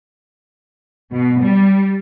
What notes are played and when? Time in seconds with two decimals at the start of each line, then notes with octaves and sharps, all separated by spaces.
1.12 B2
1.41 G3